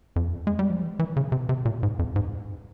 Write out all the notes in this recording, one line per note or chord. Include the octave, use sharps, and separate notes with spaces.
F2
G#3
G3
F3
E3
E3
C#3
C3
C3
A#2
G#2
F2
G#2